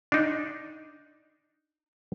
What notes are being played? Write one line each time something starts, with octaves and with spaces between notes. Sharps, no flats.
D4 D#4